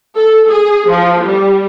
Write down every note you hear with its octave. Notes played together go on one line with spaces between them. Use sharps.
A4
G#4
F3
G3